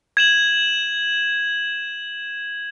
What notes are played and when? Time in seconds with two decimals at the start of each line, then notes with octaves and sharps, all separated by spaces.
0.17 G#6 E7 F#7